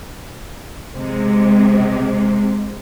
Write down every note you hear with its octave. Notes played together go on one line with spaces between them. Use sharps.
C3 G#3